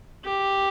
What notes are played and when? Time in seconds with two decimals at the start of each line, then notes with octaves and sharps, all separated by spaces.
0.25 G4